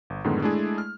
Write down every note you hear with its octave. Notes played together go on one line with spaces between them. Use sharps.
G1
F#2 A2 D3 D#3 G#3 B3
G#3 A3 D4 E4 G#4
F6